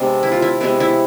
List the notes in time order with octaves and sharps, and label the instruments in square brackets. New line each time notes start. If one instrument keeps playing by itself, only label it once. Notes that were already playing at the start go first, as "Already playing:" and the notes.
Already playing: [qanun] C3 G#3 B3 D4
E4
F4
E4
C3 G#3 B3 E4
E4